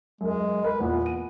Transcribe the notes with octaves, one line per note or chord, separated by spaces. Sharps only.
F#2 G#3 A#4
A#4 B4
E2 A#2 B3 F4
D#7